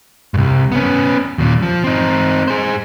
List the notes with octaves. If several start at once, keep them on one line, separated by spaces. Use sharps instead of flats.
C2 G2
B3 C#4
D#2 A#2
F3
C4 D#4
G#4 C5